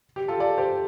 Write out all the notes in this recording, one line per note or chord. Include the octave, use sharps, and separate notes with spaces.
G4
F4 A4
A4 D5
G4 C5